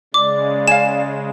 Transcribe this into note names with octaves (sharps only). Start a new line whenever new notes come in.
C#3 G#3 D5 D6
F5 G#5 E7